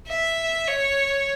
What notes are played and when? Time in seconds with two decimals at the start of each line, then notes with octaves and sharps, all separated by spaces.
0.08 E5
0.68 C#5